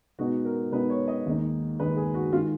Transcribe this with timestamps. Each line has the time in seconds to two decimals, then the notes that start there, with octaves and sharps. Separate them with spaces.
0.19 B2 G#3 B3 D#4 F#4
0.45 A#4
0.72 B2 G#3 B3 D#4 B4
0.90 C#5
1.08 D#5
1.26 D#2 D#3 G#3 D#4
1.79 D#2 D#3 G#3 D#4 B4
1.97 G#4
2.14 F#4
2.33 D#3 G#3 F4